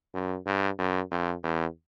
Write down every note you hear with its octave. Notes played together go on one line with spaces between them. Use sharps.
F#2
G2
F#2
F2
E2